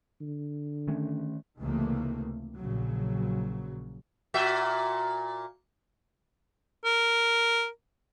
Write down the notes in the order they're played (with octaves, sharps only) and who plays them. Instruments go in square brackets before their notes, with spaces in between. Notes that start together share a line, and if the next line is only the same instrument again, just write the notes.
[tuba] D3
[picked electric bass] D#3 A3 C#4
[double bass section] C#2 C3 D#3 E3 A3 A#3
A#1 A#2 C#3 F#3
[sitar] A#2 F#4 E5
[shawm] A#4